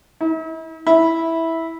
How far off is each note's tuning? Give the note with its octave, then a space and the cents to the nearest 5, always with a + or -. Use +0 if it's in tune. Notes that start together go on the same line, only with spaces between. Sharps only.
E4 -45
E4 -10